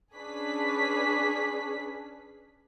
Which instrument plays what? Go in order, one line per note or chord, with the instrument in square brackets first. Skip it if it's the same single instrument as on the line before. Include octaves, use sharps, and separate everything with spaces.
[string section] C#4 D4 G#4 B4 B6